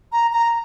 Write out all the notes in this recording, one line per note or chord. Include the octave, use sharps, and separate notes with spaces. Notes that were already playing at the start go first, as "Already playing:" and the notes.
A#5
A#5